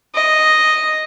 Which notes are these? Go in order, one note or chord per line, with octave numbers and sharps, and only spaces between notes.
D#5